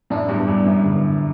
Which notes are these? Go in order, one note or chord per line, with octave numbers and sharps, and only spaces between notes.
F#2 A2 D4
E2 G2
E2 G2 G3
F#2 A2
E2 G2 D3